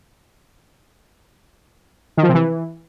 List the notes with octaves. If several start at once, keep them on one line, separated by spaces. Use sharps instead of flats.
D#3
F3
C3
E3